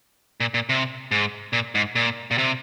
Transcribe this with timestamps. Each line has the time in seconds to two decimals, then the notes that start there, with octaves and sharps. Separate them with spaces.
0.40 A#2
0.54 A#2
0.69 C3
1.11 G#2
1.53 A#2
1.75 G#2
1.95 A#2
2.31 A#2
2.38 C3